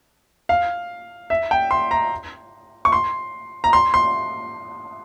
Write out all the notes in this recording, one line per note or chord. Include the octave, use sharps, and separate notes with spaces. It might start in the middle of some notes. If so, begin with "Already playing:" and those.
F5
E5
G5
C6
A#5
C#6
C6
A#5
C6
C6